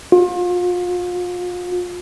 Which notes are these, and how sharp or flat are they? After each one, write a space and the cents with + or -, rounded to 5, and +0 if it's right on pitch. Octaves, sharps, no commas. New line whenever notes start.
F4 +35